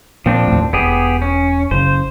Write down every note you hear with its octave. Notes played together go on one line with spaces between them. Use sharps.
A#2 F3 C4 D4
D#2 A2
E1 B3 G4 G#4
C#4
F#1 C#3 C5